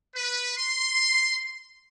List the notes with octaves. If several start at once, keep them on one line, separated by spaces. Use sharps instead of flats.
B4
C6